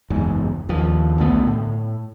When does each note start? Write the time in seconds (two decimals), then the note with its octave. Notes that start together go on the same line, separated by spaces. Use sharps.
0.10 F#1 E2 G#2
0.69 D#2 F3
1.18 B1 D3 A3 B3
1.47 A2